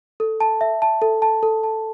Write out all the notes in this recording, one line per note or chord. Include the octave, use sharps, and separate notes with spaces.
A4
A5
E5
A5
A4
A5
A4
A5